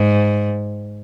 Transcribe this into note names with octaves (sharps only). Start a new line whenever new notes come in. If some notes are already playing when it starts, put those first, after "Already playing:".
Already playing: G#2